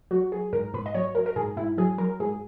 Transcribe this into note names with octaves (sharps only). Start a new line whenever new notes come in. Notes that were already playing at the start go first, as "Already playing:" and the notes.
F#3 F#4
F#3 G#4
G#2 A#4
G#2 B4
D#5
F#3 C#5
F#3 A#4
A#4
G#2 G#4
G#2 E4
F#3 G#4
F#3 A#4
G#2 G#4